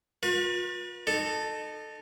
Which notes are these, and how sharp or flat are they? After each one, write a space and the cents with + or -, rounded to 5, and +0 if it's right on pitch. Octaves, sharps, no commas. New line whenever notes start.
F4 +40 B4 -40
D#4 -30 A4 +0